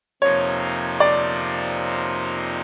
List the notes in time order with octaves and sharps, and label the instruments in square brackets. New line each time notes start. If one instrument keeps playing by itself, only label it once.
[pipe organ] F2 C3 F3 A#3 D#4 [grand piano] C#5
[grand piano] D5